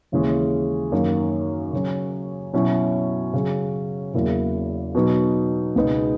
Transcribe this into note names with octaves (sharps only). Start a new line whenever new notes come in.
D#2 C#3 E3 G#3 C#4
F#2 D#3 A#3
C#3 F#3 C#4
B2 F#3 C#4 E4
C#3 F#3 C#4
E2 C#3 F#3 A#3 E4
B2 F#3 B3 D#4
C#2 B2 G#3 B3 D#4